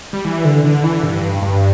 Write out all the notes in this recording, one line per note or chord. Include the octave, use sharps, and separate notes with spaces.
G3
E3
D3
D3
E3
G2
G2